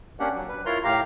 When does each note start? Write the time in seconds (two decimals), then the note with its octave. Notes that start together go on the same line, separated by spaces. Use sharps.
0.20 A#3 C#4 D4 G4 F#5
0.34 F#3
0.49 B4
0.66 E4 F4 A#4 C#5 A#5 C6
0.84 A2 G4 F5 A#5